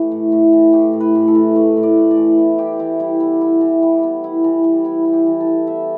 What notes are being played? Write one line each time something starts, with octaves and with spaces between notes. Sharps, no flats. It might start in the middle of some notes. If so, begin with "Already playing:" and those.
Already playing: E3 A3 G4
A2
A2
E3
A3 G4
A2
B4
A2
A4
E3
A3 B4
A2
D5
A2
D5
E3
B3 E5
E4 G4
E3 E4
G3 E4
B3 E4
E4
E3
G3
B3
E4
E3
G3
B3 E4
E4
G4
E3
A4
G3
B3 E5